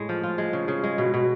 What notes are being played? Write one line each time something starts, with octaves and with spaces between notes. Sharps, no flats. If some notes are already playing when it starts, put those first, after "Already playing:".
Already playing: A2 G#3
F3
F4
G#3
C#3
C#3
G#3
B2
B2